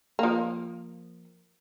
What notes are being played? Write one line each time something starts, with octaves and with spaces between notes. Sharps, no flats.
F3 A#3